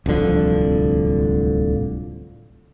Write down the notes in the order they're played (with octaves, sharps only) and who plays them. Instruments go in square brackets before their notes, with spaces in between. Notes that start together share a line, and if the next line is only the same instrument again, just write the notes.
[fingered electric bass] D1 C2 D3 F3